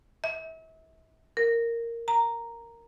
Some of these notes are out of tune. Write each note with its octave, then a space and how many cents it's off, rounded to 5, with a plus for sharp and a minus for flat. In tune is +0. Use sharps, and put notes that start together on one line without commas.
E5 -40
A#4 -10
A#5 -5